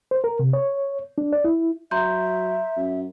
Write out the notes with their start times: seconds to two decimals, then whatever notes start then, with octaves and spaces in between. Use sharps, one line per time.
0.11 C5
0.24 A#4
0.39 C3
0.53 C#5
1.18 D4
1.33 D5
1.44 E4
1.91 F#3 E5 A#5 C6 G6
2.77 F#2